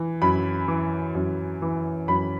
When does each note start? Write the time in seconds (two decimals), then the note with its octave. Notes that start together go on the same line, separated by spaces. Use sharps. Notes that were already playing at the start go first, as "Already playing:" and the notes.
Already playing: E3
0.22 F#2 B5
0.68 E3
1.15 F#2
1.62 E3
2.08 F#2 B5